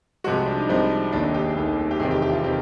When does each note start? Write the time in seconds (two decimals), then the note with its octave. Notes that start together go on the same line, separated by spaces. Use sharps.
0.24 C2 C3 F3 G#3 F#4
0.46 D4
0.57 D#4
0.69 C2 C3 F3 G#3 D#4
1.12 F1 D#2 D#3 D4
1.23 D#4
1.34 G4
1.45 G#4
1.56 F1 D#2 D#3
1.91 G4
1.99 F1 E2 C3 D#3 G#4
2.11 G4
2.22 G4
2.32 F4
2.44 C3 D#3